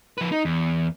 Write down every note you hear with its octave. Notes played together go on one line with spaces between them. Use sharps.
F3 B4
D#4
E2